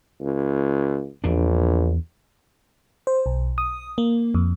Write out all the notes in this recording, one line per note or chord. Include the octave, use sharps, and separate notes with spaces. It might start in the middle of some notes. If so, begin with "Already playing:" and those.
C#2
A#1 E2 D4
C5
B1
D#6
A#3
F2